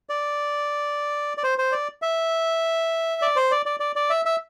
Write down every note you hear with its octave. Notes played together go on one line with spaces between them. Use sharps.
D5
D5
C5
C5
D5
E5
D5
C5
D5
D5
D5
D5
E5
E5